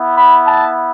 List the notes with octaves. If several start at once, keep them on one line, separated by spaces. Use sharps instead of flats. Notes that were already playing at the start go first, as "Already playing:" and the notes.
Already playing: B3 E4
B5
A5